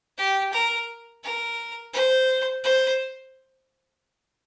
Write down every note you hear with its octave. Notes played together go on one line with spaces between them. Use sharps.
G4
A#4
A#4
C5
C5